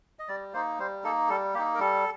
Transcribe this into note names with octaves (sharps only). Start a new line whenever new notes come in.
D#5
G3 D5
A#3 D#4 C5
G3 C5
A#3 D#4 A4
G3 A4
A#3 D#4 G4
A#4
G3 A4